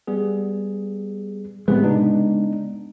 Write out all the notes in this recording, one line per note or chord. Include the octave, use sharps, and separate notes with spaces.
G3 B3 G#4
A2 C3 G#3 A3 B3 B4
C#3 D4 D#4